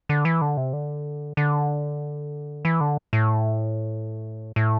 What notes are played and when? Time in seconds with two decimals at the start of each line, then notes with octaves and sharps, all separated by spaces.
0.09 D3
0.25 E3
0.42 D3
0.57 C3
0.73 D3
1.37 D3
2.65 E3
2.81 D3
3.13 A2
4.56 A2